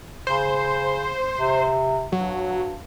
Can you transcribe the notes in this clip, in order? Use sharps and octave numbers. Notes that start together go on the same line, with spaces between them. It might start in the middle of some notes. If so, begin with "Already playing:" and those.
C#3 C5
C3
G2 F#3